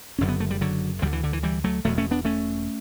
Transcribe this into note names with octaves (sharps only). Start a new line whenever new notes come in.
F#1 F#2 D3 C#4
B3
A3
G3
D3 F#3
D2 D3 E3 G3
E3
D3
E3
E3 G3
F#3 A3
E1 E2 B2 F#3 A3
A3 C#4
B3 D4
A3 C#4